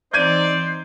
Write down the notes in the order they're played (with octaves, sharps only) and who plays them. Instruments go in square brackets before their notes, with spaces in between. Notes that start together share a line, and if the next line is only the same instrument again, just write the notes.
[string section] E3 C4 D#4 [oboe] C5 [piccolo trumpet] D5 [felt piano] G6 G#6 D#7